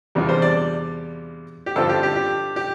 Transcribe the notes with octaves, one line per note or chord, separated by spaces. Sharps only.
E2 C3 G3 D4 F4
C5
D5
G4
G2 D3 F3 C4 F4 A4
G4
G4
G4
G4